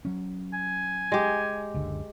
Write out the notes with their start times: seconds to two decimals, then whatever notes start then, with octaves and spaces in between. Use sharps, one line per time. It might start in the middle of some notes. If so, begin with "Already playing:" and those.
0.05 F#3 C#4
0.54 G#5
1.12 G#3 G4
1.74 F#1 C#2 D3